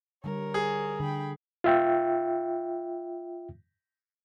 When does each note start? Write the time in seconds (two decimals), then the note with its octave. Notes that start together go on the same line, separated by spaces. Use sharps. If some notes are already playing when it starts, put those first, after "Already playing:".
0.24 D3 G3 A#4 C#5
0.54 G#4
1.00 D3 G5 B5
1.64 F4 E5 G5